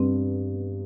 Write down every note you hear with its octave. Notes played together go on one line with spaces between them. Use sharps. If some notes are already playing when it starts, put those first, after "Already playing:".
Already playing: G2 B3 C4